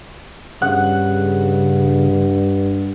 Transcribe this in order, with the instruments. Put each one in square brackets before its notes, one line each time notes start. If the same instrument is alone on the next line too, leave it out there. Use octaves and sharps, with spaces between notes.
[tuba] G2 [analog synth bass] C#3 [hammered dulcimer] F#5